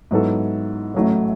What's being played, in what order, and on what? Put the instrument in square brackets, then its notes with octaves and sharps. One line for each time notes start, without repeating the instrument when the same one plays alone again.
[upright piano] G#2 F#3 B3 E4 A4
A1 A2 F#3 A3 E4